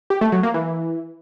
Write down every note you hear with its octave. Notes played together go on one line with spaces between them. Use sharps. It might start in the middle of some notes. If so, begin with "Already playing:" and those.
G4
A3
F#3
A#3
E3